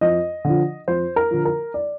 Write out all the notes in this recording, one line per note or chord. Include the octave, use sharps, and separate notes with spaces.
F2 D#5
D3 F3
F2 C5
A#4
D3 F3
A#4
D5